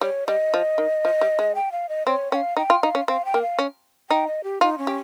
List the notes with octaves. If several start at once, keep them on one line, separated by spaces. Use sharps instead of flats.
G3 C#5
G3 D#5
F3
D#3
F3
G3
G#3
G5
F5
D#5
C4 C#5
C#4 G5
F5
D#4 G5
F4
D#4 F5
C#4
C4 F5
G5
A#3
F5
C#4
D#4 G5
D#5
G4
D#4 F4
C#4
G4